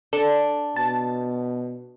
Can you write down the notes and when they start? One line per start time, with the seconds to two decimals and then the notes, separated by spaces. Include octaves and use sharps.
0.13 D4 A4
0.76 B2 A5